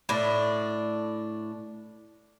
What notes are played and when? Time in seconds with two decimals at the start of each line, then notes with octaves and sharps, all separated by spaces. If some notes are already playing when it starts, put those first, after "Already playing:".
0.09 A2 D4